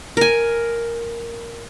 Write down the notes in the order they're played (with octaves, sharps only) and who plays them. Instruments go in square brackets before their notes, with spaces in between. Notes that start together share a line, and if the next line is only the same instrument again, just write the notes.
[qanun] A#4 G#5